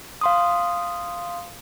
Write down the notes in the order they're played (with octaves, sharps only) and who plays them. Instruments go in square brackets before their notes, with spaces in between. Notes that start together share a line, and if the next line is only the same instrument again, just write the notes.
[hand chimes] F5 C6 D#6